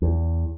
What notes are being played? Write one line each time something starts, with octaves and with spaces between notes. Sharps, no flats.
E2